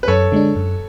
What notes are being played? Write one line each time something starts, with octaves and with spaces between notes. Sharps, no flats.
B4
F#2 A4 C#5
D3 G#3 D4
F#2